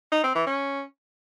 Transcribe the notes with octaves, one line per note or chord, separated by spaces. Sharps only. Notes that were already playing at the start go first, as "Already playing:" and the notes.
D#4
C4
E3
C#4